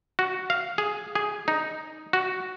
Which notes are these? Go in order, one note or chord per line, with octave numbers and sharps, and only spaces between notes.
F#4
F5
G#4
G#4
D#4
F#4